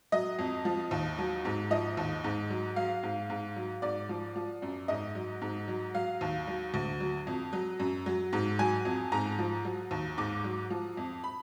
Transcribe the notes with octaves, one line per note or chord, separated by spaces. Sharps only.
F#3 D#5
F2
F3
D#2
F#3
G#2
F3 D#5
D#2
G#2
F#3
F#3 F5
G#2
G#2
F#3
G#2 D5
F3
F3
F#2
G#2 D#5
F#3
G#2
F#3
F#3 F5
D#2
F#3
D2
F#3
F2
F#3
F#2
F#3
G#2
F#3 G#5
F2
G#2 A#5
F3
F#3
D#2
G#2 D6
F#3
F3
F2
B5